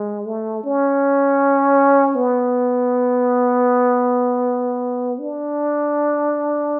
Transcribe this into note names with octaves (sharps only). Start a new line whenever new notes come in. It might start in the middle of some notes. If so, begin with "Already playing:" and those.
Already playing: G#3
A3
C#4
B3
D4